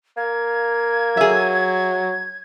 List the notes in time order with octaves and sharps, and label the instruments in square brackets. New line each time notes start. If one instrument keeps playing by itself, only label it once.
[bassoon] A#3 [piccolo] G#6
[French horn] F#3 [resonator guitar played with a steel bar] G#4 E5